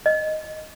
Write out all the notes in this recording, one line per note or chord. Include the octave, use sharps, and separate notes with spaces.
D#5